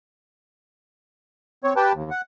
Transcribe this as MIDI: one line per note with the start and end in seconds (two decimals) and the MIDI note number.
1.64 1.73 60
1.64 1.73 73
1.76 1.92 67
1.76 1.92 71
1.76 1.92 79
1.76 1.92 81
1.93 2.10 39
2.10 2.21 78